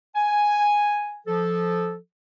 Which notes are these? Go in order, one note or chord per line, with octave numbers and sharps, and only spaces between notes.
G#5
F3 A4